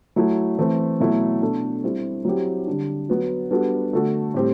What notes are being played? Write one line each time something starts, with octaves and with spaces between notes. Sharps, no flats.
F#3 A3 E4
E3 A3 C4
B2 F#3 A3 E4
B2 A3 D4 A4
G3 C4 E4 G4
F#3 C4 E4 G4
D3 G3 D4
F#3 B3 F#4
G3 B3 D4 F#4 A4
D3 A3 D4 F#4 A4
A2 G3 C4 G4